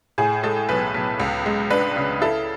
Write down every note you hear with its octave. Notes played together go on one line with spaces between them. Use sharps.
A2 G#4
G#3 A4
B1 B4
B1
C#2
G#3
D4 B4
C#3
E4 A4